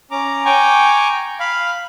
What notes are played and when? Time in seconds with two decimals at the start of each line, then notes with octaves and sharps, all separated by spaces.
0.11 C#4 A#5 D6
0.45 G5 G#5 A#5 C#6 D6
1.40 F5 B5